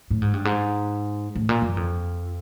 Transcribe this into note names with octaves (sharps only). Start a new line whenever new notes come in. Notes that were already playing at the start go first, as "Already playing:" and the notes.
A2
G#2
G2
G#2
A2
A#2
F#2
F2